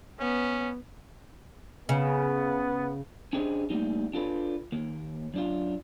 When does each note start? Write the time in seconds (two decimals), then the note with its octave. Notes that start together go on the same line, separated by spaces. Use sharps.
0.20 B3 C#4
1.89 C#3 B3
3.33 C#4 D4 G4 G#4 C5 D#5
3.70 G3 A3 A#3 D#4
4.13 D4 F4 A4 B4
4.72 D#2 A#3
5.34 F#2 D4 F4